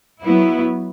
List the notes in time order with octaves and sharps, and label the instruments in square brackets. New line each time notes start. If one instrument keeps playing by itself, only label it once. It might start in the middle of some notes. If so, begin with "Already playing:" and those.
[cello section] F#3 B3 E4